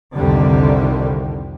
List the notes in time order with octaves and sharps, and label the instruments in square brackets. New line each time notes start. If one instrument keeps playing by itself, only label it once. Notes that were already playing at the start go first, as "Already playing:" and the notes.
[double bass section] C2 F2 D3 D#3 G3